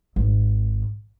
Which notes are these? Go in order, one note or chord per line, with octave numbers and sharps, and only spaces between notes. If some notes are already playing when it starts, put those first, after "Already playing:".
G#1